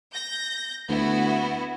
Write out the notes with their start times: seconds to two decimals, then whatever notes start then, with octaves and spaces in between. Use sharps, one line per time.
0.13 G6 A#6
0.89 D2 B3 E4 F#4